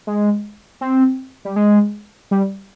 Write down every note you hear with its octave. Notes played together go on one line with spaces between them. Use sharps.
G#3
C4
G3
G#3
G3